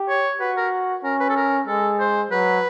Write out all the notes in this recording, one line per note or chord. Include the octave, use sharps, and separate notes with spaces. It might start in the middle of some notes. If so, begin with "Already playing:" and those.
Already playing: G4
C#5
F#4 B4
A#4
C#4 A#4
B4
A4
A#4
G#3 A4
C5
F#3 B4